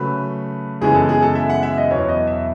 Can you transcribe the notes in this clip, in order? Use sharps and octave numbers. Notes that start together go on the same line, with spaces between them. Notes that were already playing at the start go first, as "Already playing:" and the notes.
Already playing: C#3 F#3 A3 B4
F#2 C#3 E3 G#3 B3 G#4
A4
G#4
A4
E5
F#5
E5
D#5
E2 B2 F#3 B3 C#5
D#5
E5